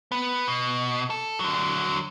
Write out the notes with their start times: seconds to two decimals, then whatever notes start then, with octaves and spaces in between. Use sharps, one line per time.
0.12 B3
0.48 B2
1.10 A4
1.39 D3 F#3